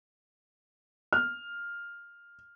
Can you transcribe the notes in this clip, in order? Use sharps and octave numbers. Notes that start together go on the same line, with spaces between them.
F6